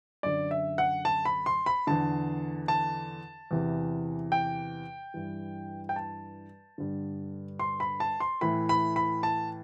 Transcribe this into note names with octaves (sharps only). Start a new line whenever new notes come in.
F#2 D3 D5
E5
F#5
A5
B5
C6
B5
E2 D3 A5
A5
E2 C3 E3
G5
G2 E3
G5
A5
G2 D3
C6
B5
A5
C6
A2 E3 B5
B5
B5
A5